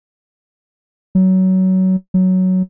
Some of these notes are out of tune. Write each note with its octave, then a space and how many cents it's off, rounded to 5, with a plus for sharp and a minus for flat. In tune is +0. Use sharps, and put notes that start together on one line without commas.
F#3 +20
F#3 +5